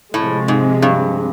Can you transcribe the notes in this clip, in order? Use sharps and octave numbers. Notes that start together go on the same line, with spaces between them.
A2 C3 F3 G#3
G#2
G2